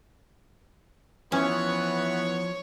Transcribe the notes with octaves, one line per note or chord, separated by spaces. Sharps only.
E3 F3 B3 C#4 C#5 C#6